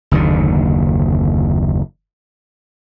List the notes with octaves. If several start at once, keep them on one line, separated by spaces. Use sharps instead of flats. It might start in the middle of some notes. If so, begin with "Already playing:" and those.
F#1 D#2 D3